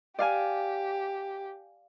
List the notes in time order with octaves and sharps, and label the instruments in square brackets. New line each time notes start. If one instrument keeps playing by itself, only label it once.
[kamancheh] G4 [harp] D5 F5 G#5